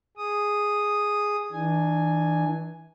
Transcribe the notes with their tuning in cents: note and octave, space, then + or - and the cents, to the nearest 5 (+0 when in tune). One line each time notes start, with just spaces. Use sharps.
G#4 +0 D#6 -5
E3 -30 D4 +20 G#5 +0